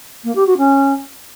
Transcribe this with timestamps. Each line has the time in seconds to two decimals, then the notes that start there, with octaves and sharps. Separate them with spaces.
0.24 A#3
0.35 G4
0.46 F#4
0.57 C#4